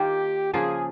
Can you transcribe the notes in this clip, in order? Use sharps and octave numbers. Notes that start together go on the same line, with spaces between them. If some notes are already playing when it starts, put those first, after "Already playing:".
Already playing: D#3 A#3 F4 G4
C#3 F3 A#3 F4 G#4